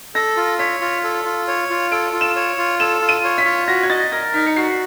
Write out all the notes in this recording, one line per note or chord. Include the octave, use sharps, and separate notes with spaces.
A4 A#6
F4
C#5 B6
F4
A4
F4
C#5
F4
A4 D7
F4
E7
C#5
F4
A4 E7
F4
D#7
C#5
B6
F4
F#4 A#6
G#6
D#5 A6
A#4 A#6
D#4 B6
C#7
F#4 C7